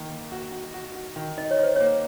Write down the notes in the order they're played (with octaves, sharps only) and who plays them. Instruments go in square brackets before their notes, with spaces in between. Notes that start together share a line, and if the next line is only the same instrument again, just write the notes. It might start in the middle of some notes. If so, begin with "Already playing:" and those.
Already playing: [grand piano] D#3 A#3
A#3
F#4
F#4
F#4
F#4
D#3
[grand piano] D#4 [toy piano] D#5
[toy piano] C#5
[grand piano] D#4 [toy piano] C5
[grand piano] A#3 [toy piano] C#5